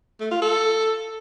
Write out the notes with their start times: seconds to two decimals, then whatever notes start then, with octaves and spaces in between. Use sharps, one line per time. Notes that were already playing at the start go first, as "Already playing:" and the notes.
0.20 A3
0.31 F4
0.42 A4